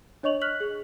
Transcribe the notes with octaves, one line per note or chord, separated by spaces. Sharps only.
D4 C#5 D#5 C#6 F7 F#7
F6 F#6 B6 F#7
G#4